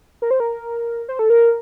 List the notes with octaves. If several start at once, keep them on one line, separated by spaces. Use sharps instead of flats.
A#4
C5
A#4
C5
A4
A#4